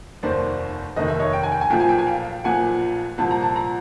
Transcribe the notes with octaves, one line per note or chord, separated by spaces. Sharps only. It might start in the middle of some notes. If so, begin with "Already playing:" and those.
F1 D#2 D#3 C5 D5
F1 D#2 D#3 D#5
E5
C#5 D#5
G5
G#5
G5
G#5
B1 A#2 F3 G5
G#5
G5
G#5
F5 G5
B1 A#2 F3 F#5 G#5
C2 A#2 F3 A5
A#5
A5
A#5